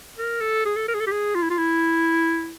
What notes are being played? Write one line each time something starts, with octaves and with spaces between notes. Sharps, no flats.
A#4
A4
G#4
A4
A#4
G#4
A4
G4
G#4
F4
E4
F4
E4